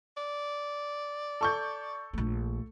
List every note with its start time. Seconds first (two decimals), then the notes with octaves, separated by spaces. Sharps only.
0.17 D5
1.41 A4 C#6 G6
2.13 A#1 A3